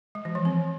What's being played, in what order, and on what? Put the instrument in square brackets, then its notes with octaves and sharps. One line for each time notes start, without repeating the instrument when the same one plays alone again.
[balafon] G#3
E3
F3
C4